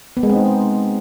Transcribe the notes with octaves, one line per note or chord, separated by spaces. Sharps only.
B3
G#3
C4
D#4